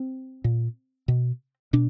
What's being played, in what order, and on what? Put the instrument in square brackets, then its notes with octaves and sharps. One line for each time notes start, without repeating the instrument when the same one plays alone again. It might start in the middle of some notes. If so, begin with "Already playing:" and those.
Already playing: [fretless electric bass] C4
A#2
B2
B2 D4